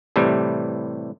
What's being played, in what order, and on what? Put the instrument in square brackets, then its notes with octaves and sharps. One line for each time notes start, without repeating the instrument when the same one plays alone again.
[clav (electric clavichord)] A2 C3 E3 G3